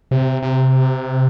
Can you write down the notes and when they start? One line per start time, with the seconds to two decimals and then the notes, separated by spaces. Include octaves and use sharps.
0.11 C3
0.42 C3